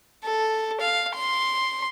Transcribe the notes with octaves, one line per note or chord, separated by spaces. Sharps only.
A4
F5
C6